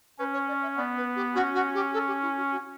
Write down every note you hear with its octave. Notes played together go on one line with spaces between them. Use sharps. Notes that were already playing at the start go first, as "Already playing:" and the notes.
C#4 B4
C#5
D5
E5
B3 D5
B4
G4
C#4 F#4
F#4
G4
A4
G4
E4
F#4
F#4